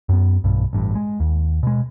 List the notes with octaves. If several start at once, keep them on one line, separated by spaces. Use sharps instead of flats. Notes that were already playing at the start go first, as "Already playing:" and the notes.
F#2 B3
B1 G2
A1 G2
G#3
D#2
B2 G#3